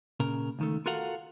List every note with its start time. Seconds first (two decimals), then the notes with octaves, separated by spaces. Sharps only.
0.20 A#2 C#3 A#4
0.59 C#2 D#3 A3
0.86 F4 F#4 A4 A#4 F5 F#5